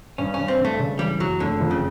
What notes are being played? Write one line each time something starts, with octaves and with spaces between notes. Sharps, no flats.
G2 C#4
G2 C#4
C4
G2
A3
C#3
E3 G3
F#1 F#3
F1 D3
F2
C#3